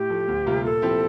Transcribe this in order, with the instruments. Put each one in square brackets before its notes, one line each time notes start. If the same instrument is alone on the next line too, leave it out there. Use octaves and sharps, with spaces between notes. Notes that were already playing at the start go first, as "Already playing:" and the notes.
Already playing: [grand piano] A2 [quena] G4
[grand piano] F3 A3
D2
C3 G3 A#3 F4
[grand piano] A#2 [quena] A4
[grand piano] F3 C4 E4 G4